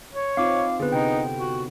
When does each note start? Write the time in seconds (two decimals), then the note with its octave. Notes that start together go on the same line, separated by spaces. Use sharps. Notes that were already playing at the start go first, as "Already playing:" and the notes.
0.13 C#5
0.37 C4 D#4 F4 F5 D6
0.80 D3 B3 G#4 B4
0.92 C3 D#4 G5
1.38 F#4